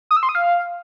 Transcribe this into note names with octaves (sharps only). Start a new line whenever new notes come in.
D#6
E6
C6
D#6
F5